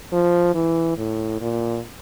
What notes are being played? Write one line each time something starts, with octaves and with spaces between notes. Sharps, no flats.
F3
E3
A2
A#2